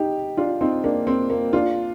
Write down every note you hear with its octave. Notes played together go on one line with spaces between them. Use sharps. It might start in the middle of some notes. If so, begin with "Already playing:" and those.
Already playing: D#4 G4
D4 F4
C4 D#4
A#3 D4
C4
A#3
D4 F4